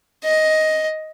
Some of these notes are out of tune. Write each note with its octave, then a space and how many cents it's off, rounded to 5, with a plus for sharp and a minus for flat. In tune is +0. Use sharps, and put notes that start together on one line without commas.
D#5 +10